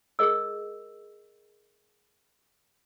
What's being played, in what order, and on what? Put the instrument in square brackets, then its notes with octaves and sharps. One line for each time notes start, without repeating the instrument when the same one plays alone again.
[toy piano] G#4 A#4 D#5 E6